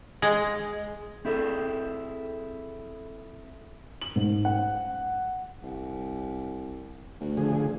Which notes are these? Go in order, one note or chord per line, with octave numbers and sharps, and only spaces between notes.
G#3
C4 E4 G#4 A4
F#7
G#2
F#5
C2
D2
D3 F3 G#4